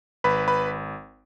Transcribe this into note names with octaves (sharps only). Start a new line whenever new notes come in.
G#1 B4 B5
B4 B5